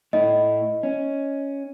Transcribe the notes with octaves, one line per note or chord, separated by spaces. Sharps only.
A2 E4 D#5
C#4